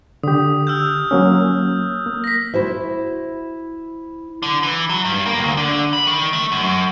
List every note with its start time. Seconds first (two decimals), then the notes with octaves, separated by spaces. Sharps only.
0.23 D3 G4 D#6
0.67 E6 F6 G6
1.11 F#3 A#3 C#4
2.06 A#3
2.24 A#6 B6
2.54 E4 F#4 C5 E5
4.43 D3
4.63 E3
4.89 F#3
5.05 G2
5.26 A#3
5.39 D2
5.57 D3
5.93 B5
6.07 D#3
6.33 A3
6.52 F#2